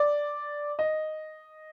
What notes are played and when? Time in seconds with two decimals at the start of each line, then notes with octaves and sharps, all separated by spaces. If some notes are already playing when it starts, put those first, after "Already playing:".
Already playing: D5
0.79 D#5